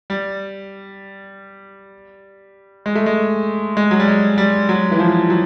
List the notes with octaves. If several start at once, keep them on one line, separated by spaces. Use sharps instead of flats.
G3
G#3
A3
G#3
G#3
F#3
G3
G#3
G3
F#3
E3
F3
F#3